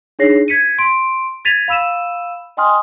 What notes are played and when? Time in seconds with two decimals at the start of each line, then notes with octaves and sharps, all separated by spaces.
0.19 D4 D#4 G#4 C#5 A#6 C7
0.48 G#6 B6 C#7 D#7
0.78 C6 D7
1.45 G#6 A6 B6 D#7 F7
1.68 F5 B5 E6 D#7 E7
2.57 D#5 G5 G#5 C6 D#6 F6